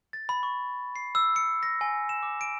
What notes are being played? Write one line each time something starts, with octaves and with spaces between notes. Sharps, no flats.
A6
B5
C#6
C7
E6
C#7
A#6
G#5
E7
D6
D7